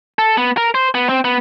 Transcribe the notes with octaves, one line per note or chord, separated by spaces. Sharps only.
A4
B3
A#4
C5
B3
C4
B3